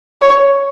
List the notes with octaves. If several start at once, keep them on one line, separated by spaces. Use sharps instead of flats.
C#5